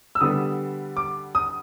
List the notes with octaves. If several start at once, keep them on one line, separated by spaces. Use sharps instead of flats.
E6
D3 G3 B3 D#6
D6
D#6